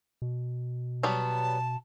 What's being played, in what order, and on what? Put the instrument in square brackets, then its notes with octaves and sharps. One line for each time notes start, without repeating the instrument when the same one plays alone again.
[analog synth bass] B2
[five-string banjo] F#3 G3 B3 [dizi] A5